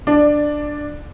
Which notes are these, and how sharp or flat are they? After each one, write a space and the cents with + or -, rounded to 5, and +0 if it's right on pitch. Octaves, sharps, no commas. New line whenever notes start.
D4 +0 D5 +15